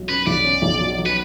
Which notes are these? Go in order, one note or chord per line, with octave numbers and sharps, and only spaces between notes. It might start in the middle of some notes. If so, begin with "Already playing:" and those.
Already playing: B1 F#3
C#4 B4
B1 D5
C#4
B1
F#3
F#3
B4